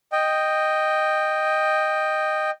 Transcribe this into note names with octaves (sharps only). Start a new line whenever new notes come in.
D#5 G5